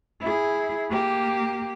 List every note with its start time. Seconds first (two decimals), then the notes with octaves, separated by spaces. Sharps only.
0.20 E4 G#4
0.89 A#3 G4